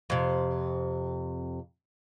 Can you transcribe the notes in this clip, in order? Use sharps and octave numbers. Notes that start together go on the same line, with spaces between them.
F2 C3